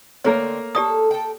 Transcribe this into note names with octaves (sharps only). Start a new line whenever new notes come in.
D3 A3 A#3 C4 A#4 C#5
G4 A4 D5 D#6
A4 G5